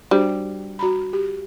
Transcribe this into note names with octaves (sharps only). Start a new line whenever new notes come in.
G3 D4 F#4 C5
F#4 A#5 B5
G4